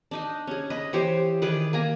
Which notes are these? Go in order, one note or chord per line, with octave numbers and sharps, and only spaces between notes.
D4 D#4 D#5
C#4 G#4
B4 D#5
E3 G4 C5 C#5
D#3 G#4 B4 D5
A#3 G#5 A#5